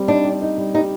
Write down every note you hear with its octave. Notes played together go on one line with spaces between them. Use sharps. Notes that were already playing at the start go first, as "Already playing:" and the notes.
Already playing: G3 C4
D4 D#4
G3
D#4
G3
G3 D#4